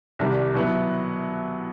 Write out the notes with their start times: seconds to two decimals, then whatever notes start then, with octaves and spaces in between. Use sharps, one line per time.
0.19 C2 C3 D#3 G3
0.54 B2 F#3 B3 E4